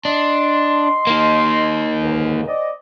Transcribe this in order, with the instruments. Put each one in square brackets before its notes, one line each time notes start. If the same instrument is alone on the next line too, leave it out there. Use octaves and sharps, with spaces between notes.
[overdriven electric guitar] D4 [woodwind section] D#5 C6
[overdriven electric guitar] A#3 D#4
[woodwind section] C#2 G#2 D3
C4 D5 D#5